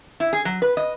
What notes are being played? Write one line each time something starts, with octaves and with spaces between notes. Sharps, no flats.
E4
G#4
F#3
B4
D#5